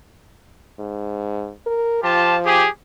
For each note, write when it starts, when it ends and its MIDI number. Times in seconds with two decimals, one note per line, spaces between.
0.79 1.52 44
1.66 1.99 70
2.03 2.65 53
2.03 2.36 65
2.03 2.36 67
2.03 2.36 81
2.45 2.68 67
2.45 2.68 68